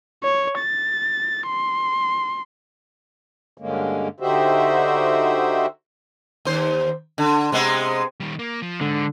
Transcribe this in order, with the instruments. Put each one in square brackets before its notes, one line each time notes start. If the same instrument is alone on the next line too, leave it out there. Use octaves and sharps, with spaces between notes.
[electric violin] C#5
A6
C6
[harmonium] G2 D3 G#3 A#3 C#4
D3 D#4 F#4 G4 C5 E5
[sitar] D#2 C5
D3
C3 G#3 B3
[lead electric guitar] D#3 G3
A#3
F3
[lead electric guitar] G#2 G#3 [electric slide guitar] D3